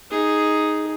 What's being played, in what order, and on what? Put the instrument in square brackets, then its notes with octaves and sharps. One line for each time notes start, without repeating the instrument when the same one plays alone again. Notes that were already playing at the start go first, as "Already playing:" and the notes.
[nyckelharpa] D#4 G#4